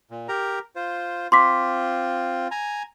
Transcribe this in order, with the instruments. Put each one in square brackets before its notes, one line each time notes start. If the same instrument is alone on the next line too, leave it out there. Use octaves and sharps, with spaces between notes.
[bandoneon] A#2
G4 A#4 A#5
F4 C5
[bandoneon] C4 F4 [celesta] C6 D6 B6
[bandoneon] G#5 A#5